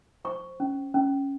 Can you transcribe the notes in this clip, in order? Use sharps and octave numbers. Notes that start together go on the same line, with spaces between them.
C5 C#6
C#4
C#4